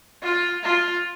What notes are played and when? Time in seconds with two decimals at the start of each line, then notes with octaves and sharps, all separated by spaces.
0.23 F4
0.63 F4